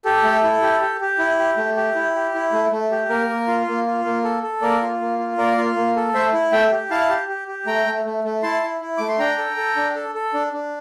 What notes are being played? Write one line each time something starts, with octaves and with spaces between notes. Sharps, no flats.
G4 A4
A3
E4
G4
G4
G4
E4
G4
A3
G4
E4
G4
E4
A3
A3
G4
A#3 A#4
A#3
F4
A#3
F4
A#3
A4
A4
A#3 A#4 D5
F4
A#3
F4
A#3 A#4 D5
F4
A#3
A4
A3 C5 E5
E4
A3 E5 G5
G4
E4 F5 A5
G4
G4
G4
A3 G5 A#5
A3
A3
A3
E4 A5 C6
E4
E4
A3 D6
C6
D4 G5 A#5
A4
A4
D4
A4
A4
D4
D4